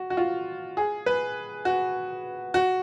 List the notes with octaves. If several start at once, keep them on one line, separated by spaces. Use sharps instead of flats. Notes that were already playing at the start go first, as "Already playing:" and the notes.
Already playing: F#4
F#4
F4
G#4
B4
F#4
F#4